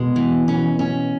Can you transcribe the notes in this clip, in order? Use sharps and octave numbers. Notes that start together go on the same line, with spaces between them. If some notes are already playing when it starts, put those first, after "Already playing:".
Already playing: B2 G#3
E3
B2 C#4
C#4